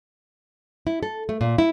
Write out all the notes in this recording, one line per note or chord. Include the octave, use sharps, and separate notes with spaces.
E4
A4
A3
A#2
E4